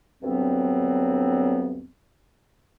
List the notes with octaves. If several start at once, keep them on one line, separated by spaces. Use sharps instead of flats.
D2 G2 F#3 B3 C4